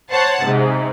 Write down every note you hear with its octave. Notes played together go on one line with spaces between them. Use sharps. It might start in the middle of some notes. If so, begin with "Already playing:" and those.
C5 C#5 F#5 A5
G#2 C3